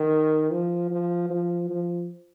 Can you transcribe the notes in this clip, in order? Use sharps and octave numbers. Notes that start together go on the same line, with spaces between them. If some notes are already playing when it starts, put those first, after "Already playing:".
Already playing: D#3
F3
F3
F3
F3